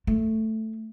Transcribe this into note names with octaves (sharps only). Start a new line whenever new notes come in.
A3